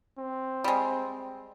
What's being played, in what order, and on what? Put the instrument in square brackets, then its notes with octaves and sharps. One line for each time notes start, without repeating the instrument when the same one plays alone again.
[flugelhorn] C4
[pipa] G3 G#3